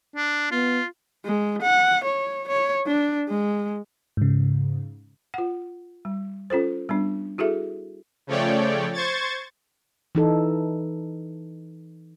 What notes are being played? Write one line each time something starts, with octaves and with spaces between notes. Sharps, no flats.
D4
B3 F4
G#3
F#5
C#5
C#5
D4
G#3
G#2 C#3
F4 F#5
G3
C#4 F4 A4 C5
G3 B3 D4
E4 F#4 G#4 A4 E5
C#3 F3 A3 C#5 D5 G5
C5 C#6 G#6 A6
E3 D#4 A4